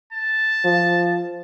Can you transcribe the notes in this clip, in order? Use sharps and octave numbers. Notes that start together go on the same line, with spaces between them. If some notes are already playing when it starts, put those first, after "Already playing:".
A5
F3